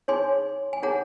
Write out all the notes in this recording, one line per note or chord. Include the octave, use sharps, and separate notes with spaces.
D#4 G#4 C#5 G#5 C6
G#5
D#4 G#4 C#5 F#5 A#5